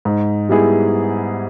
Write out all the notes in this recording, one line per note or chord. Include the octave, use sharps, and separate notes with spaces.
G#2
G3 B3 E4 G#4